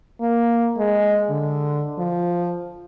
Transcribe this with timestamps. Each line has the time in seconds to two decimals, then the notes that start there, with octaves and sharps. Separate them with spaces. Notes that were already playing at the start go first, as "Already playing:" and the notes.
0.21 A#3
0.77 G#3
1.30 D3
1.98 F3